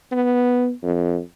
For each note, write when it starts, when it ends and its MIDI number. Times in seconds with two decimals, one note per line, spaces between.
0.12 0.72 59
0.83 1.19 41